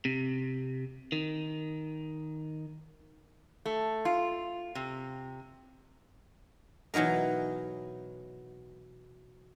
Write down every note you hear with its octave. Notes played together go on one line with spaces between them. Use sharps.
C3
D#3
A3
F4
C3
B2 E3 F#3 D#4 A#4